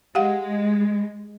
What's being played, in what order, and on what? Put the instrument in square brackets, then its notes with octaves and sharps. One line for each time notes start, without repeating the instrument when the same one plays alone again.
[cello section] G#3 [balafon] G4 F5 F#5